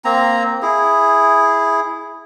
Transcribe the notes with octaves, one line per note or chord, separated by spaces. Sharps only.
A#3 C4 A#5
E4 G#4